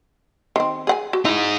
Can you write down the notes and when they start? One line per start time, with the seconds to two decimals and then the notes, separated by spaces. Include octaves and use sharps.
0.56 D#3 C4
0.87 G#4 F#5 G#5
1.13 F#4
1.25 D#4 E4 G#4